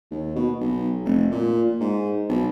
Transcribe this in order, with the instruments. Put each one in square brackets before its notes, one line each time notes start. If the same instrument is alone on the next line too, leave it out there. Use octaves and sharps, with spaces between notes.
[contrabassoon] D#2
B2
B1
F1
A#2
G#2
B1